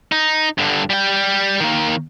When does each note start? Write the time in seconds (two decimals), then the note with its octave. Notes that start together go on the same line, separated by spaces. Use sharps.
0.12 D#4
0.58 G2 D3
0.90 G3 G5
1.60 D#3 A#3